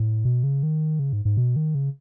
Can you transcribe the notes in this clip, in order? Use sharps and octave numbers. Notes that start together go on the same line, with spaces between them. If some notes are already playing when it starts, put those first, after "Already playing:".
Already playing: A2
B2
C#3
D#3
C#3
G#2
G#2
B2
D#3
C#3